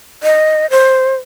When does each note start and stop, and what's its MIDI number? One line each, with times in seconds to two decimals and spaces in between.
0.23 0.66 75
0.71 1.16 72